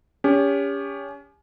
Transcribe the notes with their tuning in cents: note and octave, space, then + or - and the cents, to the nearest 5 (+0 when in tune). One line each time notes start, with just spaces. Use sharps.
C#4 +30 G4 +35